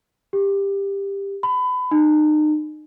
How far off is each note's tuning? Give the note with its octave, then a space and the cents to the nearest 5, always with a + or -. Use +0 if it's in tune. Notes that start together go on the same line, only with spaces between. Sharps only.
G4 +15
B5 +25
D#4 -35